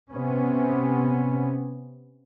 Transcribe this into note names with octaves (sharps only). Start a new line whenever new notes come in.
C3 B3 C#4